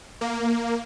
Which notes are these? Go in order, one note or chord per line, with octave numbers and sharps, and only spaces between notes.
A#3